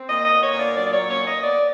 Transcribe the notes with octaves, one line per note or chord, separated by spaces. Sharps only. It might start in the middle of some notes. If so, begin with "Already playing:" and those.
Already playing: C4
A#2 D#5
D#5
B3
C#5
A#2
D5
F#3 D5
D5
C#5
A#2
C#5
B3
D#5
B3 D5